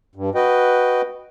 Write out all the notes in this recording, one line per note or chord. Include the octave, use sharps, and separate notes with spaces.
G2
F#4 B4 D#5 G5